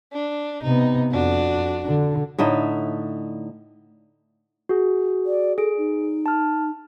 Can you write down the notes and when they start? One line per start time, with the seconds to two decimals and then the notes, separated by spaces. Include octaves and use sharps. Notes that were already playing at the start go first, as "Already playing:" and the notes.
0.13 D4
0.63 C3 B3 D#4
1.12 F2 D4 F#4
1.85 D3
2.38 A2 D3 D#4 E5
4.69 F#4 G#4
5.25 D5
5.58 G#4 A4 D7
5.77 D#4
6.26 A5 F6